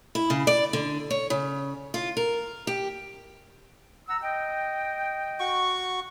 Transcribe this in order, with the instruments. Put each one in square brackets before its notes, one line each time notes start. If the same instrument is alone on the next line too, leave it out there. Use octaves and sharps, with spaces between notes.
[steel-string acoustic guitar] E4
C#3
D5
D3
C#5
C#3
F4
A#4
G4
[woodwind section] F#5 A#5 E6
D#5 G5
[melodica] F#4 C#6